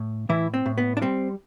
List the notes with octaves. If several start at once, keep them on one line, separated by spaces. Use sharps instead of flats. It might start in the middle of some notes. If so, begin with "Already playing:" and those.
Already playing: A2
A2 E3 E4
C4
A2
B3
D4
G3 C4